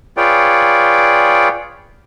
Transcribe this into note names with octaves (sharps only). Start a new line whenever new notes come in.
F4 G#4 B4 C#5 D5 G5